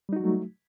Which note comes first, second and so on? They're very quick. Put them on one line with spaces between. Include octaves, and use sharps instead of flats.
G3 D#4 F#4 F#3 A3